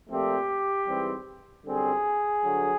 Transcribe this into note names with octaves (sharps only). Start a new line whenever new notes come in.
A#2 F3 A3 C4 G4
G#2 E3 G3 C4
F#2 D3 G3 C4 G#4
G2 D3 F#3